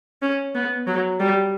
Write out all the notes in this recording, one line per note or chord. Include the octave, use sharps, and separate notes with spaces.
C#4
B3
F#3
G3